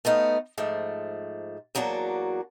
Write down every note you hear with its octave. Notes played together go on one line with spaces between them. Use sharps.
A3 B3 D#4 F5
G#2 F3 A3
E2 F#3 A#3 D4 F#4